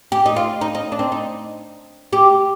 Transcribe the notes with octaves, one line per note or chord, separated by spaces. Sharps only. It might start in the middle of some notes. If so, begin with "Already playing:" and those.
G4
D#4
F4
D#4
D#4
D4
C4
D#4
G4